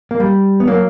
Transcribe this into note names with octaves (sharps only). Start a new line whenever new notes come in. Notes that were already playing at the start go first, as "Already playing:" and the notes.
A#3
G3
B3
F#3 A#3